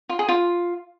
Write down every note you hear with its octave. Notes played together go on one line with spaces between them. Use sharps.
F4
G#4
F4